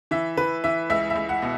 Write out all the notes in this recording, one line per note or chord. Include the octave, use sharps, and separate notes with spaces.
E3 E5
E3 B4
E3 E5
C#2 E5
E5
C#2
F#5
B2